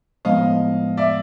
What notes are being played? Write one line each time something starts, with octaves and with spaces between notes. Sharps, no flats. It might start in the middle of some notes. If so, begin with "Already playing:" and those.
A2 F3 G#3 B3 D#5 F5
D5 E5